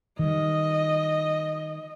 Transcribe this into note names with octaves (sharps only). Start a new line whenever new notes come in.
D#3 G3 D#5